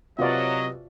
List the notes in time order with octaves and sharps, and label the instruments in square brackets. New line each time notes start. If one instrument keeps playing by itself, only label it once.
[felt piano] C3 B4 [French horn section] F#3 [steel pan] F4 F#4 D5 [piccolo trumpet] D#5